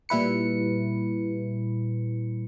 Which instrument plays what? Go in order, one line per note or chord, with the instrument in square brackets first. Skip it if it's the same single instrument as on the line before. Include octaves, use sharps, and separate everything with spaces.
[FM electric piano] A#2 G3 E4 B4 C#7